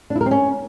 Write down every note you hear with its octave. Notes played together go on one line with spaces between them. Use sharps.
D4
E4
A#4
C4
C#4